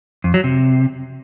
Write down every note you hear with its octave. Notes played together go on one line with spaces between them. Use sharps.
F2
F#3
C3